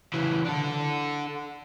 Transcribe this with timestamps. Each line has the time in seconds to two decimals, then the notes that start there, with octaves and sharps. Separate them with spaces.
0.14 C#3 E3
0.45 D4 A4